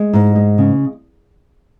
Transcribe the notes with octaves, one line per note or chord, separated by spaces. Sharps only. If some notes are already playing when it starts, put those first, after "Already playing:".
Already playing: G#3
G#2
G#3
C#3